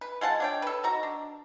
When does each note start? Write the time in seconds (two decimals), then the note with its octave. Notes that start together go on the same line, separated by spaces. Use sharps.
0.01 B4
0.21 G#3 F4 F#5 A5
0.40 D4 C#5 G5
0.62 A4 B4
0.83 D#4 F#4 A#5
1.03 D4